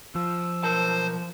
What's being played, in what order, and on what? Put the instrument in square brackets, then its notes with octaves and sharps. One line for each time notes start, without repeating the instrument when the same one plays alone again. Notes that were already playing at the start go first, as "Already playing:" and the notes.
[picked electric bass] F3 [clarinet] E6
[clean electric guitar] B1 A#4 A5 [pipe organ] C5